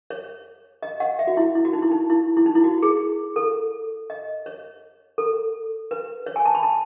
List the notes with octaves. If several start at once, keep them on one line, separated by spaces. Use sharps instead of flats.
C#5
D#5
F#5
E5
F#4
E4
E4
F#4
D#4
E4
D#4
E4
E4
D#4
E4
F#4
G#4
A4
D#5
C#5
A4
B4
C#5
G#5
A5
B5
A5